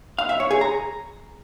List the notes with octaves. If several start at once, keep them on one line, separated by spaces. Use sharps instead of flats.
F5
E5
C#5
G#4
A#5